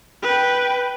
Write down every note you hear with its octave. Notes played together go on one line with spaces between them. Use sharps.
B4 G5